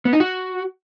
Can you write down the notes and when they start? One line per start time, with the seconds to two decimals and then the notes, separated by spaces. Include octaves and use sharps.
0.05 B3
0.13 D#4
0.20 F#4